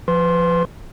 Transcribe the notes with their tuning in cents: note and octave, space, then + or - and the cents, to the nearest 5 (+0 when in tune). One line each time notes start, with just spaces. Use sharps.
F3 +0 B4 +25 C6 +15